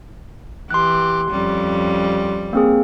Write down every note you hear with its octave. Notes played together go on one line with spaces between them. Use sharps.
E3 G4 C6 F#6
F2 G3 C#4
A#3 C4 G#4